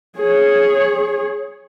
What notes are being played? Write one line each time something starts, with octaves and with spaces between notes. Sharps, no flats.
G#4 C#5